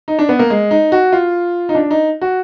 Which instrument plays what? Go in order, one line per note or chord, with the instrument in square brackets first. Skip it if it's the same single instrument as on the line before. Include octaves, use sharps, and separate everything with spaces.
[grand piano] D#4
D4
B3
A#3
G#3
D#4
F#4
F4
D#4
D4
D#4
F#4